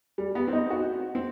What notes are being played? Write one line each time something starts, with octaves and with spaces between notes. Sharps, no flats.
G3
B3
C4
D#4
F#4
C4